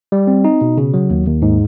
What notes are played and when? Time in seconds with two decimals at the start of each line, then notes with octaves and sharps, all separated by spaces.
0.12 G3
0.27 C4
0.44 D#4
0.61 B2
0.77 C#3
0.94 F#3
1.10 D#2
1.27 D#2
1.42 G#2